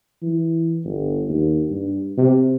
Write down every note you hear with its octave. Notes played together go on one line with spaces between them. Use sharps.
E3
G1
D#2
G2
C3